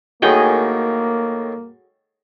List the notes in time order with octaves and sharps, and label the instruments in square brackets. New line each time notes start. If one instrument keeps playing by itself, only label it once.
[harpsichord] A2 D#3 [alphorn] A#3 [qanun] F#4 G#4 G5